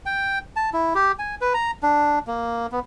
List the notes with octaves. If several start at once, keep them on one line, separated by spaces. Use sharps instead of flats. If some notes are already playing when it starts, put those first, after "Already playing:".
G5
A5
E4
G4
G#5
B4
A#5
D4
A#3
B3